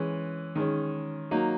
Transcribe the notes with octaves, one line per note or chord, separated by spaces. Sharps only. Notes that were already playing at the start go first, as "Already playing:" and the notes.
Already playing: E3 G#3 C#4
D#3 G#3 C#4
F#3 A#3 D#4